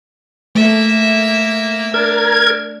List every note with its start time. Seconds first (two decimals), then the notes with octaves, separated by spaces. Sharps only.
0.55 A3 A#3 E5
1.94 D4 A#4 G#6